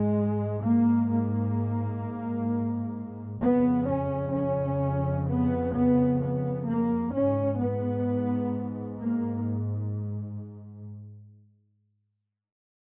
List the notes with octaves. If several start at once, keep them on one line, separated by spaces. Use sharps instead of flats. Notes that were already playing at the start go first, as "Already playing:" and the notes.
Already playing: G#2 G#3
A#3
A#3
F2 C#3 B3
C#4
C#4
B3
B3
B3
A#3
G#2 C#4
B3
A#3